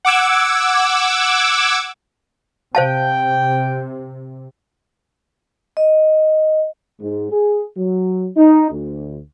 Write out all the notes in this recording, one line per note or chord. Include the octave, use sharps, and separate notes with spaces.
F#5 D6 E6 G#6
C3 C5 F5 G5 A5
D#5
G#2
G#4
F#3
D#4
D2